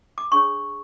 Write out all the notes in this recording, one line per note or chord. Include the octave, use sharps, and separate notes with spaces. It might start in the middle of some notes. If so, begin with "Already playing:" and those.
D6
D4 G#4 C#5 C#6